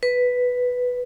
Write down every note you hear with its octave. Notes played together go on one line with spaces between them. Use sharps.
B4